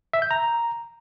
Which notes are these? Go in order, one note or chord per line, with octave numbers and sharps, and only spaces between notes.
E5
G6
A#5